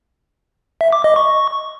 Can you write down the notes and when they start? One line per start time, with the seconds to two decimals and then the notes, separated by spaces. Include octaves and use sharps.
0.81 E5
0.93 D6
1.04 D#5
1.16 C#6